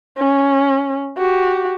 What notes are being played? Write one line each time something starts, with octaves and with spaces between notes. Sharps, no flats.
C#4
F#4 G4